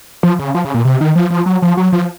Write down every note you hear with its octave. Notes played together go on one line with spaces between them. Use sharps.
F3
C#3
F3
C#3
A#2
C3
D#3
F3
F3
F#3
F3
F#3
F3